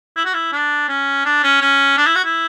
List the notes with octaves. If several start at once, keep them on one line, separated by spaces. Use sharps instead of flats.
E4
F#4
E4
D4
C#4
D4
C#4
C#4
D4
E4
F#4
E4